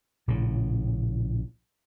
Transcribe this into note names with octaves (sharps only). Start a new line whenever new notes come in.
A#1 A2 C#3